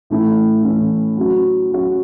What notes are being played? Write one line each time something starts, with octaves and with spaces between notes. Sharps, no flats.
A2 E3 A3 C#4 E4
A2 E3 A3 C#4 E4
F#3 C#4 F#4
F#3 C#4 F#4